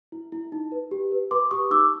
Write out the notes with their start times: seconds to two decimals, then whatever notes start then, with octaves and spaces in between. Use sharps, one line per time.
0.12 E4
0.32 E4
0.52 D#4
0.72 B4
0.91 G4
1.12 B4
1.31 B4 C6 D6
1.51 G4 C#6 D#6
1.71 D#4 D6 E6